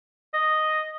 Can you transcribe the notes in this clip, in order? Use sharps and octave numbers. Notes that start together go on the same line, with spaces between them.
D#5